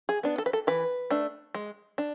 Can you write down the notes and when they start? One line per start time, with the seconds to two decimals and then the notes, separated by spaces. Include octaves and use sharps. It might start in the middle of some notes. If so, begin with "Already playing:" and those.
0.09 G#4
0.23 B3 D4
0.38 A4
0.46 B4
0.53 A4
0.67 E3 B4
1.10 A3 D4
1.54 G#3
1.98 D4